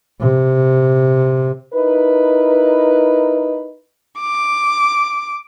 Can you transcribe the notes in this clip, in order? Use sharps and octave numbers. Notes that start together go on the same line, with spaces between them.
C3
D#4 E4 A#4 B4
D6